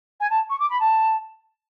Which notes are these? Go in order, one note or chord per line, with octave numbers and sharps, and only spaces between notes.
G#5
A5
C#6
D6
B5
A5